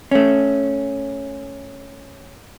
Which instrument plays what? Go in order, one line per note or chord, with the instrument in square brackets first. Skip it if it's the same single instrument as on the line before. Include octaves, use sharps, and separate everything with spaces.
[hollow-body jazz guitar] A3 C#4